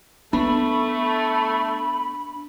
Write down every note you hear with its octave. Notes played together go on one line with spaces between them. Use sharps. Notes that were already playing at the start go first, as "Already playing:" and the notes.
A3 B3 D4 B5